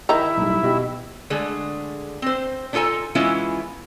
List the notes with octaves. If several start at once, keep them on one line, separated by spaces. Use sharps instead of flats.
D#3 D#4 E4 A#5
B1 G3
B2 G4
D3 G#3 A3 G#4
C4 C5
D4 D#4 F4 A4 G#5 A#5
E3 G#3 B3 C#4 E4 F4